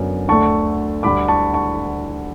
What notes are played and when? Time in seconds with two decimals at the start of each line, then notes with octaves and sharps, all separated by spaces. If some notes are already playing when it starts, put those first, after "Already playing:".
Already playing: F#2 D3 F#3 B3
0.28 D2 D3 A3 A5 C#6
1.03 D2 D3 G3 B5 D6
1.28 A5 C#6
1.54 A5 C#6